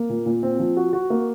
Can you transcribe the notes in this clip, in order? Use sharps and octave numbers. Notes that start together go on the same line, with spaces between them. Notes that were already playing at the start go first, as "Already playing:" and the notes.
Already playing: A#3
A#2
A#2
C4
F3
F#4
F#4
A#3